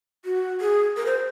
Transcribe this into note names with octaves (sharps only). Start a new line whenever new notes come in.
F#4
G#4
A#4
C5